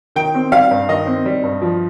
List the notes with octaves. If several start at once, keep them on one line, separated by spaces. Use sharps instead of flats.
D#3 G5
C4
G3 F5
G2
D#3 D#5
C4
G3
G2
F3